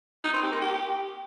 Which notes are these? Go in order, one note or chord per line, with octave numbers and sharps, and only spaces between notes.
D#4
C4
G4
A#3
G4